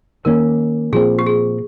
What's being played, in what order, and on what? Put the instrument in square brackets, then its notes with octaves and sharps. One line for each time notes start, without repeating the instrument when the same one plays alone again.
[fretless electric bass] D#3 A#3 C#4 [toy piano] A#4
[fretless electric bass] A#2 F3 C4 [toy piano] G#4
[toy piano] G4
G#4